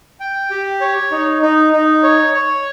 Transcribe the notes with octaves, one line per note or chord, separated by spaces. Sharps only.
G5
G4
C#5
D#4
D#4
D#4
C#5
C#5